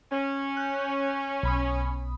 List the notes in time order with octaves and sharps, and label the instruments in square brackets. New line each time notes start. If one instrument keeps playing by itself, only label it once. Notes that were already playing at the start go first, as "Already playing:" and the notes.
[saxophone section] C#4
[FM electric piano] F#6 G6
B1 B5 D#6